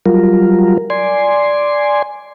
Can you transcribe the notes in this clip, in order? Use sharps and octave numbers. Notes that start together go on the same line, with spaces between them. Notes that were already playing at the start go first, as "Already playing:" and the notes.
F#3 G3 F4 A#4
D5 G#5 C6